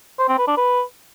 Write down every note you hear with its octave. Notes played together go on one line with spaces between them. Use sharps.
C5
C4
B4
D4
B4